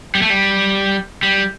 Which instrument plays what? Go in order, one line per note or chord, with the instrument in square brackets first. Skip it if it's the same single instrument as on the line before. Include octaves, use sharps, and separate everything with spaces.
[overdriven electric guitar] G3
A3
G3
G3